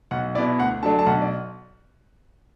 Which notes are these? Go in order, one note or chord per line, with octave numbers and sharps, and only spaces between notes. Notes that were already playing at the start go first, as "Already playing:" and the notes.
B1 F#5
B2 B3 E4 D5
D2 F#5
D3 F#3 A3 D4 A5
A5
B1 F#5
D5